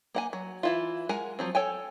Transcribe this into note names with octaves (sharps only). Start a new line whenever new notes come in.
A#3 F#5 G#5
F#3
E3 E4 F4
G#3 A#4 F#5 G#5
F3 F#3 C4
A4 C#5 G5 G#5